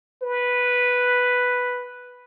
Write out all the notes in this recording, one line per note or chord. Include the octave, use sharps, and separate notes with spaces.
B4